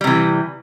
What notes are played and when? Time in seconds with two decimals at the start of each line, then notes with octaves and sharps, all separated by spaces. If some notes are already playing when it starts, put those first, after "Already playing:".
0.01 G3
0.04 C3
0.07 E3